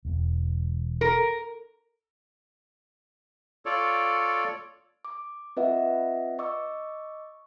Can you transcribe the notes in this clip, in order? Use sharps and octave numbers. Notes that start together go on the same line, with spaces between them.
E1 E2 E3
A#4
F4 A4 C#5 D5
D6
C4 F4 B4 D#5 E5 F#5
D#5 C#6 D6 E6